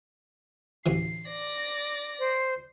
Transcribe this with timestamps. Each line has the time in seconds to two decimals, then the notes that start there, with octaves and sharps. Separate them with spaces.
0.86 A1 D2 E3 C7
1.28 D5 A#6
2.19 C5